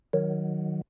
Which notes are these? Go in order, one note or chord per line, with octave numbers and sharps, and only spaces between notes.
D#3 F#3